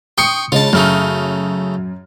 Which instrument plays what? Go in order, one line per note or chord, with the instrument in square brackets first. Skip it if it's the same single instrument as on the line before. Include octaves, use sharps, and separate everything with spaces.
[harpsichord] G5 C6 C#6 [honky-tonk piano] D#6 C#7
[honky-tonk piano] C#3 G#3 [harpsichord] F4 A5
[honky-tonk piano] F#2 F6 [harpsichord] C#3 A3 D#4